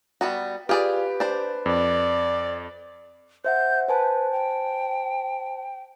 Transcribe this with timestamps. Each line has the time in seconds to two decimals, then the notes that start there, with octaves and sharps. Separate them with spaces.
0.21 G3 B3 F#4
0.69 F4 G4 G#4 B4 D5
1.20 D4 C5
1.66 F2 D5
3.45 C5 E5 F#5 G6
3.88 B4 C5 G#5 A5
4.32 G5